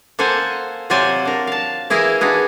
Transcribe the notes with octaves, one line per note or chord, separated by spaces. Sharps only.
A#3 A4 C5 F#5 G#5
C3 F#3 F4 C5 D5 G#5
D4 A#4
F5 A5
E3 E4 G#4 A#4 D#5 F5
D4 D#4 F#4 G#4 B4